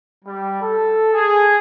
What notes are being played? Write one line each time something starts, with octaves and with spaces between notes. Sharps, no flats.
G3
A4
G#4